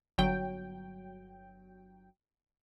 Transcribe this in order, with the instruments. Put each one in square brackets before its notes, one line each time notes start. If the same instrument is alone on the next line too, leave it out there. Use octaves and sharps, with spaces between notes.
[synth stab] G1 F#3 G5